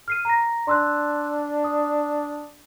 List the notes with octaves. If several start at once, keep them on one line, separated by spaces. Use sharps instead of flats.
F6 C7 D#7
A#5 A#6
D4 C6 E6 F#6
D#6